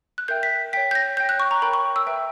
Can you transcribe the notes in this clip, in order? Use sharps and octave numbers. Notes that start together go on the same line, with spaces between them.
F#6
A#4 E5 G5 G6
B6
C#5 G5 B6
G6
A#6
C#5 G5 G6
F#6
C#6
A#5
A#4 C#5 G5 B5
C#6
E6
B4 E5 G5